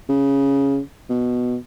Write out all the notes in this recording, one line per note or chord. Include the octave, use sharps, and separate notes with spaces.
C#3
B2